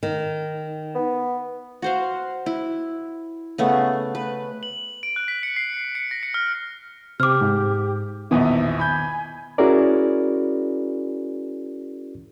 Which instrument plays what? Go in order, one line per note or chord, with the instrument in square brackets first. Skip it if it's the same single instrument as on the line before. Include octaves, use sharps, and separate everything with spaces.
[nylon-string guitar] D#3
[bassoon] B3
[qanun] F#4 C5 F5
E4
C#3 A3 B3
B4
[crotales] F#7
D7
F#6
B6
C#7
C7
C#7
A#6
C#7
F6
[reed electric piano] C3 C5 [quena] G4 [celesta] D6 F6
[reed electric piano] G#2
[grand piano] A#1 E2 B2 [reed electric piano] D#3 B3 D#6 [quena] E5
[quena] G#5 [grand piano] B5 G6
[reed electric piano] C#4 E4 F#4 G#4 A#4 D5